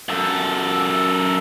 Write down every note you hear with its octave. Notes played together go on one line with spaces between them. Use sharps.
F#2 A4